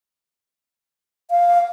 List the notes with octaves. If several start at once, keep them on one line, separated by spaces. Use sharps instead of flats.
F5